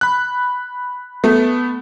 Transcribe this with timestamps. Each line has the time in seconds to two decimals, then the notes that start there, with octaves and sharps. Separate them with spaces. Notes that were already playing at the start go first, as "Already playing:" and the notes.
0.01 B5 F#6
1.24 A3 B3